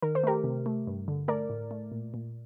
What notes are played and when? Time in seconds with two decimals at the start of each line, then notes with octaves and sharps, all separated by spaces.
0.02 D#3 A#4
0.15 C5
0.23 A3 G4 A#4
0.44 C3
0.66 A3
0.87 G2
1.08 D3
1.28 A3 A#4 D5
1.50 A2
1.71 A3
1.92 A#2
2.14 A#2